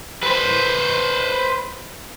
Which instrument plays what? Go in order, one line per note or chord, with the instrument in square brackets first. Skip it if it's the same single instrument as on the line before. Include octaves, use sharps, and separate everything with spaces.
[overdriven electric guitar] B4 C5